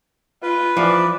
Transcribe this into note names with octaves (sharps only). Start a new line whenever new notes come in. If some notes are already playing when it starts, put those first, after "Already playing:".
F4 B4
E3 F3 D5